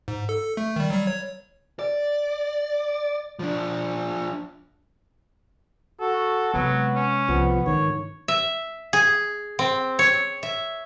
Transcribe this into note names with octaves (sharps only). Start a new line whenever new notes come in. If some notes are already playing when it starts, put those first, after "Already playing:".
G#2
A4
A3
D#3 G3
F#3 G3
C#5
D5
F3 D4
F#4 A4
C3 F#3 G#3 B3
C#4
C2 F3 B3
G#2 D3 D#3 C#5
E5
G#4
C4
C#5
E5